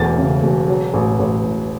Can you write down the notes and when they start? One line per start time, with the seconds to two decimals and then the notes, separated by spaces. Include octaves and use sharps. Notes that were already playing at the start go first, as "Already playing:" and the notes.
Already playing: E1 E2 A3 A6
0.18 C#3
0.43 E1
0.68 F#3
0.94 A1
1.19 A1
1.44 A2